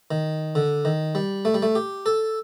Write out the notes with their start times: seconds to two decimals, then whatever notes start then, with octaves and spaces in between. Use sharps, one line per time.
0.11 D#3
0.55 D3
0.85 D#3
1.15 G3
1.45 A3
1.54 G3
1.62 A3
1.75 G4
2.06 A4